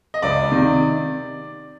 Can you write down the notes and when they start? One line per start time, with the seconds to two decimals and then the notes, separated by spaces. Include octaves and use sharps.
0.14 D#5
0.22 C#2 D5
0.52 C3 D#3